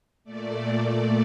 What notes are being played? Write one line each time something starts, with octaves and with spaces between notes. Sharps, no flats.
A#2 A3 D5